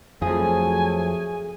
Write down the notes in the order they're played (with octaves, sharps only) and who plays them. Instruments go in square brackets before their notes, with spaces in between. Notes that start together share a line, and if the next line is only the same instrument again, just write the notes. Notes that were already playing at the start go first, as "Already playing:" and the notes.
[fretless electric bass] F2 F3 [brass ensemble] F#3 A3 [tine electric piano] G#4 D#6 [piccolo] G#5